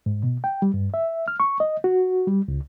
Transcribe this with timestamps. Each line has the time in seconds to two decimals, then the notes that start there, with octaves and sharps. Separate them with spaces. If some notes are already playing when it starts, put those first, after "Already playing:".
0.06 G#2
0.23 B2
0.44 G5
0.62 G3
0.74 G2
0.94 E5
1.28 F6
1.40 C#6
1.60 D#5
1.84 F#4
2.27 G3
2.48 C#2